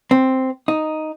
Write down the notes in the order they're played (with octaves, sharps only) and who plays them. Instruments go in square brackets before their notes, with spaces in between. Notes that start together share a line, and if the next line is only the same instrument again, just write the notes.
[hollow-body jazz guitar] C4
D#4